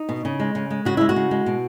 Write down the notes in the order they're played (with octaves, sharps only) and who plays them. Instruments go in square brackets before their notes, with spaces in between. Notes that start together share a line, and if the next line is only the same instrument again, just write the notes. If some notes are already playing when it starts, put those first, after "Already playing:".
Already playing: [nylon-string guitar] D#4
B2
C#3
G#3
C#3
G#3
C#3 F#4
G#3 E4
F#4
C#3
G#3
B2